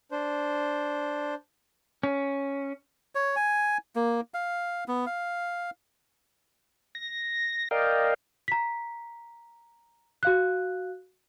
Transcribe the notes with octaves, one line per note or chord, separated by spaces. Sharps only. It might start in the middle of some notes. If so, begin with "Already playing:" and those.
D4 C5
C#4
C#5
G#5
A#3
F5
B3
F5
A#6
A#4 D5 D#5 F5 G5
A#5 B6
F#4 F5 F#6